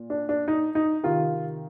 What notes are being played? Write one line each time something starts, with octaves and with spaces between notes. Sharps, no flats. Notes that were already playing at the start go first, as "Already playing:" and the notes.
Already playing: A#2
D4
D4
D#4
D#4
C3 D#3 F4